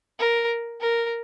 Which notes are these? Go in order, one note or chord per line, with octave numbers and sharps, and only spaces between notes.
A#4
A#4